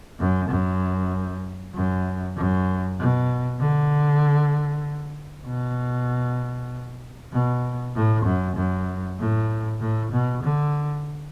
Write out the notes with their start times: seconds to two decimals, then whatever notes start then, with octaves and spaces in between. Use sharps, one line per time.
0.19 F#2
0.49 F#2
1.74 F#2
2.36 F#2
2.98 B2
3.60 D3
5.46 B2
7.33 B2
7.95 A2
8.25 F#2
8.56 F#2
9.19 A2
9.80 A2
10.12 B2
10.43 D3